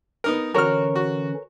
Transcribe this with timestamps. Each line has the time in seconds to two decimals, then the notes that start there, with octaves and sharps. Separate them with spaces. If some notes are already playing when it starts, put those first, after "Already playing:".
0.24 B3 D#4 A#4
0.54 D3 E3 C#4 F#4 A#4 C#5 F6
0.96 F#4